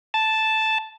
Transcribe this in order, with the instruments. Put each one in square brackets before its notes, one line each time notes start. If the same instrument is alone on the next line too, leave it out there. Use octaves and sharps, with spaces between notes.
[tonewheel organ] A5